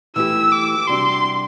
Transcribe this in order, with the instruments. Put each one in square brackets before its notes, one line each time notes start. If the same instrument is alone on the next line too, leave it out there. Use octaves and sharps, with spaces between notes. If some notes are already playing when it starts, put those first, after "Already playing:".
[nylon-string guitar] E3 A3 E4 G4 [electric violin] E6
[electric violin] D6
[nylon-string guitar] C3 G3 D4 F#4 [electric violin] C6